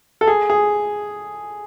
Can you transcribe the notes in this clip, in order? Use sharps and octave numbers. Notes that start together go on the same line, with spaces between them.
A4
G#4
G#4